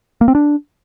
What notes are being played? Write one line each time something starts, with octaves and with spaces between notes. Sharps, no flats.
A#3
C4
D4